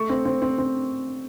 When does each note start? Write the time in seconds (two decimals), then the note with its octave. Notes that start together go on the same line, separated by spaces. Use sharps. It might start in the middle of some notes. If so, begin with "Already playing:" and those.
Already playing: A3 C#6
0.09 C4
0.25 C4
0.42 C4
0.58 C4